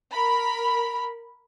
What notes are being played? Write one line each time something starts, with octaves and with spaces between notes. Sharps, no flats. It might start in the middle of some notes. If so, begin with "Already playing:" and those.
A#4 B5